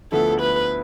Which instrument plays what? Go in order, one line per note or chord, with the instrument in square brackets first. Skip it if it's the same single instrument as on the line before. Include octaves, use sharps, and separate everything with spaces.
[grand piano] D2 D3 F3 B3 E4 [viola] A4
[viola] B4